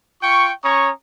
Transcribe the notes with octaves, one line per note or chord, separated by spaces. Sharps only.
F4 G5 C#6
C#4 C#5 A#5 C#6 D#6